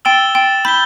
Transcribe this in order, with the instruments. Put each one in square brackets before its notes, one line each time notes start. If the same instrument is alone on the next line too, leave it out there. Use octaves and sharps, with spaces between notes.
[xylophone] G5 [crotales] E6 A6 E7 G7
[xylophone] G5
[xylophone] B5 [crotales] G6 B6 E7 G7